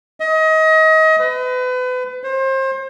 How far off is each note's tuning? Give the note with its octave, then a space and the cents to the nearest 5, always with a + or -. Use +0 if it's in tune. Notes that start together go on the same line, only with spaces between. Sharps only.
D#5 +30
B4 +35
C5 +30